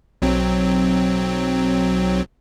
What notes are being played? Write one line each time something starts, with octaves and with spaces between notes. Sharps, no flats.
B1 F#3 C4